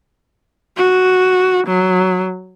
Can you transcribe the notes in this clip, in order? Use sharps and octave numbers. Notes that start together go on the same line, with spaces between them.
F#4
F#3